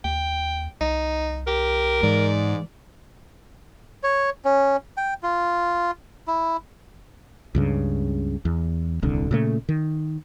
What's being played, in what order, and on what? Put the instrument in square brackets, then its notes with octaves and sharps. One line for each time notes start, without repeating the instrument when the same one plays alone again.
[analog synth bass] D#2 [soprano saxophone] G5
[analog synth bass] C2 [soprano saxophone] D#4
[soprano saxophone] G4 [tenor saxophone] A#4
[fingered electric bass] G#2 [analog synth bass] E3 [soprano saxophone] D5
[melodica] C#5
C#4
G5
F4
E4
[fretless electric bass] C#2 G2 C#3
E2
D#1 C2 D3
A#2 C#3 A3
D#3